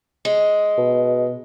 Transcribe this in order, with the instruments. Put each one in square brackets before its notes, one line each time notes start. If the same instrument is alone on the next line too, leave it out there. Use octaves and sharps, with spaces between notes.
[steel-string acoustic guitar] G#3
[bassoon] B2